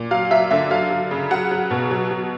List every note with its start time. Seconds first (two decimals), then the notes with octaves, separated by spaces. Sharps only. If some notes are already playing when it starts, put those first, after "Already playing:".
Already playing: A#2
0.11 F#3 F5
0.31 F#3 E5
0.51 D3 E5
0.71 F#3 F5
0.90 F#3
1.11 C#3
1.31 F#3 F#5
1.51 F#3
1.71 B2
1.91 F#3
2.11 F#3